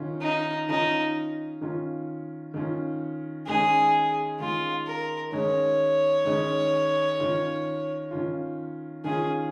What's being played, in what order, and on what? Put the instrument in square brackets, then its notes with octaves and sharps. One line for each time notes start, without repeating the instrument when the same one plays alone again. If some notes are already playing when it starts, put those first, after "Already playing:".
Already playing: [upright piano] D#3 C#4 F4
[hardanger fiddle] D#4
[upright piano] D#3 C#4 F4 [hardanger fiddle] D#4
[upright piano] D#3 C#4 F4
D#3 C#4 F4
[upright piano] D#3 G#3 C#4 [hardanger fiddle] G#4
[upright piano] D#3 G#3 C#4 [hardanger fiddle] F4
[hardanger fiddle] A#4
[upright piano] D#3 G#3 C#4 [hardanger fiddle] C#5
[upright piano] D#3 G#3 C#4
D#3 C#4 F4
D#3 C#4 F4
[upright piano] D#3 C#4 F4 [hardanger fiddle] G#4